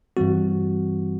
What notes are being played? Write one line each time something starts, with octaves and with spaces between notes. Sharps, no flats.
G2 E3 G3 C4 F#4